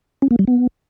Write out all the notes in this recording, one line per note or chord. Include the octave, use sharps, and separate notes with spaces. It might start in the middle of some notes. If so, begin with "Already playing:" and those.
C#4
A#3
G3
B3